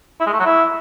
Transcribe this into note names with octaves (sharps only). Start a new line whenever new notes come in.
E4
G#3
A3
F#3
E4